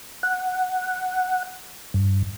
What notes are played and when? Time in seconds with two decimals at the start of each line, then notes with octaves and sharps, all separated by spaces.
0.23 F#5
1.94 G2